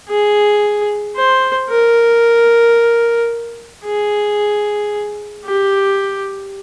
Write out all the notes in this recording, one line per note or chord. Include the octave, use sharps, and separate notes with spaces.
G#4
C5
A#4
G#4
G4